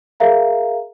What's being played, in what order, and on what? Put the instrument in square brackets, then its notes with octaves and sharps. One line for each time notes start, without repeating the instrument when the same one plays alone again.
[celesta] G#4 A#4 E5 F5 A#5